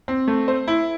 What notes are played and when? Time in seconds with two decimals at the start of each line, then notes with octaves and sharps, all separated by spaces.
0.08 C4
0.28 A3
0.48 C5
0.68 E4